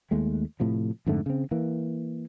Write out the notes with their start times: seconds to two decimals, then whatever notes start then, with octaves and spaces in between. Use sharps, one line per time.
0.11 D#2 G#3 A3
0.60 A2 C3 F3
1.07 F2 G#2 D3 A3
1.26 C#3 C4
1.51 E3 A#3